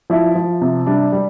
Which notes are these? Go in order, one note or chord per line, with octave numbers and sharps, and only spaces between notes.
F3 E4
F3
C3
G3 D4
G3